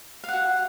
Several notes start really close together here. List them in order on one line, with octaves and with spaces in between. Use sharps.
F5 F#5 F#4